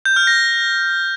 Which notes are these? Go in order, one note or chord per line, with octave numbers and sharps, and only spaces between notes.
G6
F6
A#6